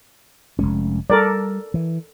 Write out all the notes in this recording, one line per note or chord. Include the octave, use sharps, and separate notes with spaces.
F1 G#3 C#4
G3 A4 A#4 D5
E3